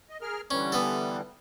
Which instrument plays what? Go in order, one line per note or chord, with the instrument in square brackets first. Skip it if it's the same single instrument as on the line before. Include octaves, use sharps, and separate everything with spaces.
[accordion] D#5
G#4 A#4 F6
[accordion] D3 E3 G3 [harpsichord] C#4
[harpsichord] B3 A4